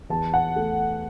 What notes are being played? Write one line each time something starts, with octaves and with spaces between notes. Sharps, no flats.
E2 A5
F#5
A3